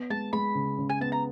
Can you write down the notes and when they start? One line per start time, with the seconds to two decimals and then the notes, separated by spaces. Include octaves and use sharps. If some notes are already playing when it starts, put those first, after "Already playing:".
Already playing: B3
0.10 G#3 A5
0.33 G#3 B5
0.55 C#3
0.78 C#3
0.89 G#5
1.01 B3 A5
1.12 A#5